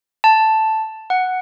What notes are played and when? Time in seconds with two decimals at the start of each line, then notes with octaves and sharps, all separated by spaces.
0.24 A5
1.10 F#5